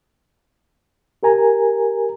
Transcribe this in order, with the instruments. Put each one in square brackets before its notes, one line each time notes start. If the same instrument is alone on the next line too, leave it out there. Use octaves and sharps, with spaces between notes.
[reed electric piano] G4 A#4 G#5 A#5